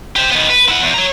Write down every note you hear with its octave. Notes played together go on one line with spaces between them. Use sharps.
G4 C5
D#3 B3
B4
E4 F#5
E2
C#5 A#5